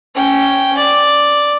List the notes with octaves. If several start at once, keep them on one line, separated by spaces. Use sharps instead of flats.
C#4 G5
D5